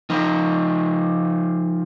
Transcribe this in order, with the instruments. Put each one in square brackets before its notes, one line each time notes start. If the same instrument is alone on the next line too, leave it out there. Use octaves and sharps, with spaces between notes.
[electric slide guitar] F3 D#4